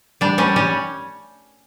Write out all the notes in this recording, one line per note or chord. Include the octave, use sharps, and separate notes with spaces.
G3 D4
G3 C#4
G3 C#4